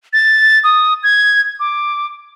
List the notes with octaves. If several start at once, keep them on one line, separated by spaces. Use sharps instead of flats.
A6
D#6
G#6
D6